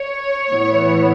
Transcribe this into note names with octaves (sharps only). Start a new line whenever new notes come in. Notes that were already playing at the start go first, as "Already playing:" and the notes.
Already playing: C#5
A2 E3 B3 E4